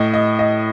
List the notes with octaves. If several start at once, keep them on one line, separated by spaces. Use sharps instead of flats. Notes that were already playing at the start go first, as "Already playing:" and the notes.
Already playing: A2 D#5
D#5
D#5